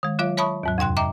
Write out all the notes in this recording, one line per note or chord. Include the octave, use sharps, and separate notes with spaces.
D#3 G#3
F#3 F4 C#5 F5
C#5 E5 A5 B5 C#6 D#6
D#2 G#2 F#3
F2 C3 G5 C6 F#6
D#5 E5 G5 A#5 D6